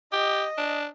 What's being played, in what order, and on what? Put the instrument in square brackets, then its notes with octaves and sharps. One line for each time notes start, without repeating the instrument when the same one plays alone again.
[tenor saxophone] G4 [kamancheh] D#5
[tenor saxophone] D4